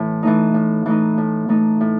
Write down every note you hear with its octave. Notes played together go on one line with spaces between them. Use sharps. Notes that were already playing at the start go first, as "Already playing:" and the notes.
Already playing: A2 E3
E3 A3 D#4
A2
E3 A3 D#4
A2
E3 A3 D#4
A2